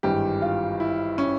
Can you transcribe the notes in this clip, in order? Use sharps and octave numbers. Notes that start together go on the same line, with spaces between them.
G#1 G2 E3 G4
F4
E4
C#4